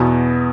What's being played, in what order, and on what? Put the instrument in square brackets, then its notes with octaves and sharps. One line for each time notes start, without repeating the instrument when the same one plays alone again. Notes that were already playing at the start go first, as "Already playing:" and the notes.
Already playing: [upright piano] E2 B2 B3